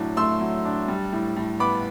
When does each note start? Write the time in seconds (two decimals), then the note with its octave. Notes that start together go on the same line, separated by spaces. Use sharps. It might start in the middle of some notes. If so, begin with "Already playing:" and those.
Already playing: A2 F#3 D4
0.17 A3 C6 E6
0.40 F#3
0.65 D4
0.88 G3
1.12 A2
1.36 A2
1.60 B3 B5 D6